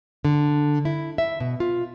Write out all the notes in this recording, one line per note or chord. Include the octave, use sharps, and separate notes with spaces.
D3
E4
E5
B2
F4